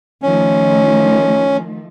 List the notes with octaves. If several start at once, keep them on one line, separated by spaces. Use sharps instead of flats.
D#3 F3 A3 C#4